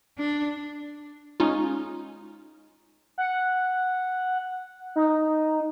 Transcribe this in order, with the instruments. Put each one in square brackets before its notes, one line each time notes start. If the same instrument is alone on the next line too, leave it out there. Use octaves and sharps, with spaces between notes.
[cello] D4
[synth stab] G#3 C#4 D#4 F4
[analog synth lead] F#5
D#4